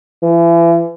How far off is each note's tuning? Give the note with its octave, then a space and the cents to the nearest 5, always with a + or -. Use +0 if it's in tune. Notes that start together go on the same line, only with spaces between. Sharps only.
E3 +35